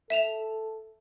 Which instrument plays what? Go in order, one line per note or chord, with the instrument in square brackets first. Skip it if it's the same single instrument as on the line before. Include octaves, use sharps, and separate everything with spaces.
[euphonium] A4 [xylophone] E5 E7 F7